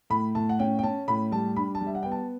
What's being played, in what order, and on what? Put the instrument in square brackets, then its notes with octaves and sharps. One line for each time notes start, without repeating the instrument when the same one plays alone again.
[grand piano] A2 B5
A2 A5
F#5
C#4 G5
G5
C#4 A5
A2 B5
G3 A5
D4 B5
A5
G3
E5
F#5
B3 G5
A5